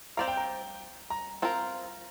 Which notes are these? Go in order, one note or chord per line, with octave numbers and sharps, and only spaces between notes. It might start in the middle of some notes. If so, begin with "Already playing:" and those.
C4 G4 D5 F5 A#5
G5
A#5
A#5
C4 F4 A#4